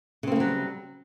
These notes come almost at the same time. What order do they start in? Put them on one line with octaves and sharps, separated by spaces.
C#3 C4 A#3 G3 F#3